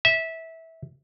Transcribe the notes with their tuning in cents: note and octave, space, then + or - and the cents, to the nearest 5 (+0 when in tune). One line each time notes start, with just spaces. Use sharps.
E5 -20